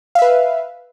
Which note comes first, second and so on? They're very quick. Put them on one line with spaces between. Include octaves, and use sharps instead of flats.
F5 E5 B4